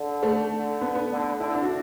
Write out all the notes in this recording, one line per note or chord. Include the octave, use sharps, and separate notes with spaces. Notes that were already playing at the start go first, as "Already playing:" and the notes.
Already playing: D3
A3
D3
B3
B3
D3
D3 E4
D4
F#4